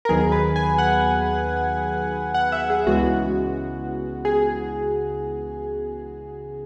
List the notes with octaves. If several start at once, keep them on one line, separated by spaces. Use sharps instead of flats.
A#4
D#2 D#3 F#3 B3 G#4
B4
G#5
F#5
F#5
E5
G#4
C#2 C#3 E3 G#3 B3 F#4
G#4